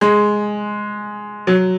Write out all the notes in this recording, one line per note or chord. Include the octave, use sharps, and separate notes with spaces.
G#3
F#3